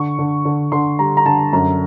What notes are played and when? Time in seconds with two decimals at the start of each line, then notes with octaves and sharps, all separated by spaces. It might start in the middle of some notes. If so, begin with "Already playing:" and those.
Already playing: D3 C#6
0.19 D3
0.45 D3
0.72 D3 C6
0.99 G3 A#5
1.17 A#5
1.26 D3 A5
1.53 F#2 A#5